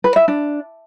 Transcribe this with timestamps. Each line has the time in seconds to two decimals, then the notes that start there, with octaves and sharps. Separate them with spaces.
0.04 B4
0.16 E5
0.28 D4